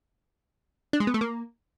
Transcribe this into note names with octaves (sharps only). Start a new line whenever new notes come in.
D4
G#3
B3
A3
A#3